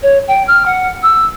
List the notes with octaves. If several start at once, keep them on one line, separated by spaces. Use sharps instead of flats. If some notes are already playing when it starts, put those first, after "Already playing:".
C#5
G5
F6
F#5
E6